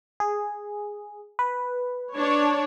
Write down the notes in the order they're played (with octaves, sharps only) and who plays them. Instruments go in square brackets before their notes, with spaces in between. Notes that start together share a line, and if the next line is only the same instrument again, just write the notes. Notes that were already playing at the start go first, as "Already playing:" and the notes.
[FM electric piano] G#4
B4
[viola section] D4 C#5